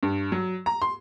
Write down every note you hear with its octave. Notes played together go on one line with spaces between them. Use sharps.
G2
F#3
A#5
C6